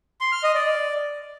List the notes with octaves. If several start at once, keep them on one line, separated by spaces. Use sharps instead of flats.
C6
F6
D#5
D5